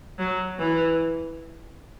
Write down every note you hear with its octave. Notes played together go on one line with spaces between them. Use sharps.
F#3
E3